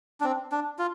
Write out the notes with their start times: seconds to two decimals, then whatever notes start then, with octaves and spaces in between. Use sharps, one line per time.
0.20 D4
0.24 C4
0.52 D4
0.79 F4